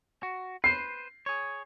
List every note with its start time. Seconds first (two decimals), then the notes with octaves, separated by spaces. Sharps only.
0.23 F#4
0.64 B4 C5 C7
1.26 G#4 C#5